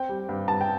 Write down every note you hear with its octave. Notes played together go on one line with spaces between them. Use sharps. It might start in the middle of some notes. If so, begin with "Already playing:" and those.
Already playing: C4 G5
G3
G2
G2 A5
G5